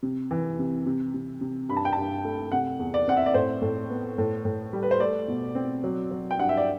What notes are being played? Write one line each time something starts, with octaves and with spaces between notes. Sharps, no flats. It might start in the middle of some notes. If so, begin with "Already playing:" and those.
C3
E3
C3
C3
C3
C3
G2 B5
A5
G5
G2 A5
A3
C3 F#5
E2
D5
C4 F#5
E5
D5
A2 C5
A2
B3
A2
A2
G3
B4
C5
A3 D5
B2
C4
F#3
F#3
G5
G2 F#5
E5
D5